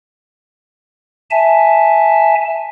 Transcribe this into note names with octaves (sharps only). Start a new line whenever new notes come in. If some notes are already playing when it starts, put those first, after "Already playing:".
E5 G#5 A5